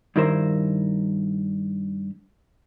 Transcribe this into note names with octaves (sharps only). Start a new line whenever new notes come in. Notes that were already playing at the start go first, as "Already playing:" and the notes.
G2 D#3 E4 A#4 C5